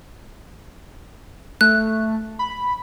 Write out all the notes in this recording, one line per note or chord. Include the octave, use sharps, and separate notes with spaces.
A3 F#6
B5